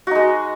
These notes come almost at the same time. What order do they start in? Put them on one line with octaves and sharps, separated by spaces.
F#4 D#4 G#3